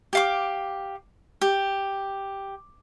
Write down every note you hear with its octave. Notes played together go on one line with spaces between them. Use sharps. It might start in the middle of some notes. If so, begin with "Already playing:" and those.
G4 F5 D6
G4